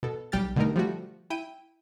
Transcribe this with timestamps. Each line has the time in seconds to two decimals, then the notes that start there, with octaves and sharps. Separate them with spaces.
0.03 B2 A4
0.32 B1 G3 G4 F6 A6
0.56 B2 D3 G3 A3 D#4 A#4
0.76 F3 G3 A3 F#4
1.30 E4 G5 D#7